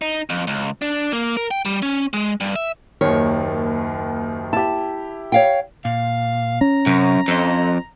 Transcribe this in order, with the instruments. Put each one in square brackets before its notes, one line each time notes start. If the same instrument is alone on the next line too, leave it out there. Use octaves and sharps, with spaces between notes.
[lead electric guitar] D#4
F2
C#2
D4
A#3
A#4
G5
G3
C#4
G#3
G2
E5
[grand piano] F#1 D#2 D#3 [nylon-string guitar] C#5
[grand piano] E4 G4 [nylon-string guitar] A5
[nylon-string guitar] C#5 F5 G5
[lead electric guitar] A#2 [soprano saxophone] F5
[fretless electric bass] C#4 [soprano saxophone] A#5
[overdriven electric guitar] F#2 [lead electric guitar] C3
[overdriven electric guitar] F2 [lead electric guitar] A4 D#5